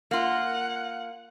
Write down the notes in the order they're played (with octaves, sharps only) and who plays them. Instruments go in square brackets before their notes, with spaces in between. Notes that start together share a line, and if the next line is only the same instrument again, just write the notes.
[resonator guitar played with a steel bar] A#3 F4 [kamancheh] F#5